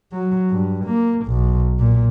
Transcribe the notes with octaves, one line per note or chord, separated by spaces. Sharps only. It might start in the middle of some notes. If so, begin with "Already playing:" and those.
F#3
G2
A#3
B1
A#2